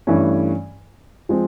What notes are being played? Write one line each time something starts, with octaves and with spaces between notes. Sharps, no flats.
G2 E3 A3 C#4
F3 G#3 C4